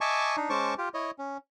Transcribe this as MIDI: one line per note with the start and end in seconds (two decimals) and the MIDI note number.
0.01 0.36 75
0.01 0.36 76
0.01 0.36 80
0.01 0.36 81
0.01 0.36 85
0.01 0.36 86
0.36 0.49 62
0.36 0.49 63
0.50 0.74 56
0.50 0.74 61
0.50 0.74 72
0.50 0.74 81
0.50 0.74 85
0.50 0.74 86
0.78 0.89 65
0.78 0.89 67
0.94 1.11 64
0.94 1.11 73
0.94 1.11 75
1.19 1.37 61